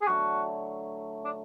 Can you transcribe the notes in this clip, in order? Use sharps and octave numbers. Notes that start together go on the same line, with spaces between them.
G#4
D3 F#3 A3 E4 F#4
D4